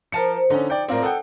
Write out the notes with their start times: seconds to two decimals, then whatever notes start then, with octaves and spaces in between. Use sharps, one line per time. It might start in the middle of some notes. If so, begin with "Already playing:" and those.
0.12 F3 A#4 A5 C#7
0.50 D3 C#4 D#4
0.70 D5 G5
0.88 A2 C4 F4 A#4 D5
1.02 D#4 A4 F#5 G5